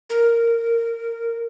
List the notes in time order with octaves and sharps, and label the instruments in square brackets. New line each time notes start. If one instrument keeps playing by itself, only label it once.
[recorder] A#4